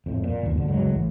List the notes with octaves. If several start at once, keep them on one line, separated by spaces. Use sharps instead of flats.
F2 A2
A#2
G1 D#2
D2 D3
C#2 G2 F#3 G#3
A1 A2